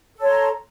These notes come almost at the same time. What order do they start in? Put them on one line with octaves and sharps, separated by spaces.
A4 C#5 C6 A#5